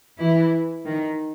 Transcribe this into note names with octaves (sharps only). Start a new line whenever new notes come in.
E3 E4
D#3 D#4